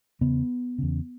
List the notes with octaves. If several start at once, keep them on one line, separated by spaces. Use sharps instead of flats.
E2 C#3 B3
E2 C#3